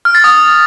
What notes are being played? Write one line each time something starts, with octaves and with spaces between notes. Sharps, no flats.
F6
A6
D#6